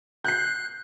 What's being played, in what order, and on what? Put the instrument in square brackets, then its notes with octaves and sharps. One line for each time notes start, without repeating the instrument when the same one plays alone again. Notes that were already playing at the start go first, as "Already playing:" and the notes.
[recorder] F#6 [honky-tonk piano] G6 C7